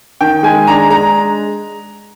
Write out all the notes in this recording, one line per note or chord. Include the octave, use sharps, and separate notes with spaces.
D#3 G5
G#3 G#5
D4 A#5
G#3 A#5